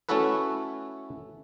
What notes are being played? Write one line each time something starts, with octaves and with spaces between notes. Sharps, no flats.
A3 C#4 E4 F#4 A4 B4